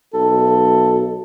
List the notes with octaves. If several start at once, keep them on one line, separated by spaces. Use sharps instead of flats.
B1 A4